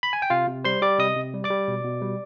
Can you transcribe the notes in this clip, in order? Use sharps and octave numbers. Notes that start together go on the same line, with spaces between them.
B5
G#5
G5
C3 F4 F5
C3
G3 C5 C6
G3 D5 D6
C3 D#5 D#6
C3
G3
D5 D6
G3
B2
B2
G3